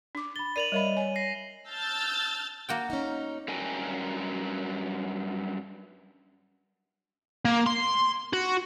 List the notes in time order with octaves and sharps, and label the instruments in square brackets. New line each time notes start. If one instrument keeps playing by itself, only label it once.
[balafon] D4 D6
[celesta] B5 A6 [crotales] G7
[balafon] A#4 D5 [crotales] D#7 F7 F#7
[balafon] G3 A#4 B5 [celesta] C#5 D#5 E5
[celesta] C#5 [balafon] G#5
[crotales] A#6 C7
[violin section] A5 E6 F6 G6 A6
[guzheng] A#3 F#4 G5
[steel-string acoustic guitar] C#4 D#4
[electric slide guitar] G2 F#3 C#4 A#4 G5 G#5
[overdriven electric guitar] A#3
C6
F#4